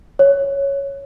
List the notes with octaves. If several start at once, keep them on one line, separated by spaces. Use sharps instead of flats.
C#5